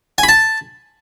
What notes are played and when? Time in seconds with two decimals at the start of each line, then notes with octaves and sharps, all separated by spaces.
0.18 G#5
0.23 B5
0.29 A5